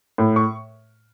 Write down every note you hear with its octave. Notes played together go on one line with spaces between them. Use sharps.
A2
C#6